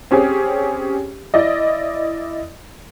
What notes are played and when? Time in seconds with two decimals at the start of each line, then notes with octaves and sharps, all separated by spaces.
0.11 C4 C#4 G4 G#4
1.34 E4 D5 D#5